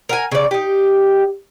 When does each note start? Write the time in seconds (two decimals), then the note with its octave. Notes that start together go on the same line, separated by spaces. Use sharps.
0.09 A#4 F#5 G#5
0.32 C#3 D5
0.51 D#4 G4